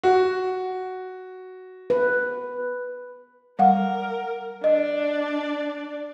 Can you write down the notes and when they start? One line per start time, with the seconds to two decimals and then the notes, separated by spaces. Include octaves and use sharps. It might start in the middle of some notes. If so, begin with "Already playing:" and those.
0.03 F#4
1.90 B4
3.59 G3 A#4 F5 F#5
4.64 D4 D5 D#5